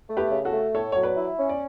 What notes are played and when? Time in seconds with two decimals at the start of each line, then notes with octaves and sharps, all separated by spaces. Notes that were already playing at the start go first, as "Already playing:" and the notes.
0.10 A3
0.17 G4 B4
0.30 C#3
0.45 F#4 A4
0.52 A3
0.74 A2 A4 C#5
0.92 F#3 C#5
1.03 B4 D5
1.16 E4
1.38 C#4
1.49 D5